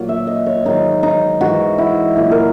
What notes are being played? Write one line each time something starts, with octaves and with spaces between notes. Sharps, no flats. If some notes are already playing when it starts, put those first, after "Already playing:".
Already playing: A#2 F#3
E5
D#5
C#5
G#2 D#3 F#3 D#4
D#4
G#2 E3 F#4
E4
A#2 F#3 E4
A#4